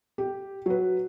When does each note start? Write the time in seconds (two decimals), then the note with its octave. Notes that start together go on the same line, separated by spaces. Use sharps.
0.18 G4
0.66 F#3 B4